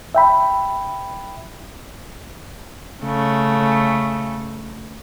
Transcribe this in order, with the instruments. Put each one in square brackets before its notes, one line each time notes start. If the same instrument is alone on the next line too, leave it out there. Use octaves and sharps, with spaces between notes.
[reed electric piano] E5 G5 B5
[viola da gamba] C#3 A3